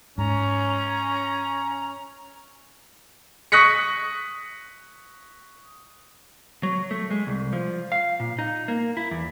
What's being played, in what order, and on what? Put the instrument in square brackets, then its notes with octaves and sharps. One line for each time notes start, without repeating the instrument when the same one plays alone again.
[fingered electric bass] G#2 [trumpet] C#4 [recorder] A#5
[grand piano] C#6 D#6 F#6 A#6 B6 C#7
[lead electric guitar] F#3
A3
G#3
C2
F3
F5
A#2
D#4
A#3
E4
E2